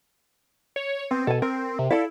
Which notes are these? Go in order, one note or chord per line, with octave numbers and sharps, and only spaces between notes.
C#5
B3 C4
B2 A4 G#5
C4 A#4
C3
E4 A4 D5 F5